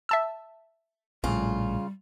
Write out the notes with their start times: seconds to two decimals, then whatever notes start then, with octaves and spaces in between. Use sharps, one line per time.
0.09 E5 A5 E6
1.24 A#1 A2 C#3 G3 F4